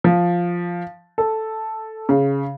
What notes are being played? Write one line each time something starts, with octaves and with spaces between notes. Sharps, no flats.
F3
A4
C#3